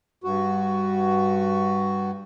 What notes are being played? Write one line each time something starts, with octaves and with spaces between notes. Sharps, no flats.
G2 F#4